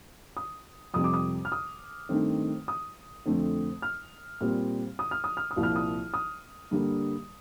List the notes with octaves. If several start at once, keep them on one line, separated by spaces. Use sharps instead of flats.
D#6
F2 C3 G3 C4 D#6
D6
D#6
F6
D#6
G2 D#3 A3 C4
D#6
F2 D3 A3 C4
F6
A#2 G3 C4
D#6
F6
D#6
F6
D#6
C2 A#2 F3
F6
D#6
D#6
G2 D3 G3 A#3